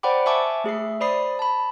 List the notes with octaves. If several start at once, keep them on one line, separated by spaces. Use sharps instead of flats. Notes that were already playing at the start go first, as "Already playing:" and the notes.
C5 D5 F#5 G5 B5 D6
E5 G#5 A5 C#6 D6
A3 G#4 E5 C7
C5 D5 B5 D#6 C7
A5 B5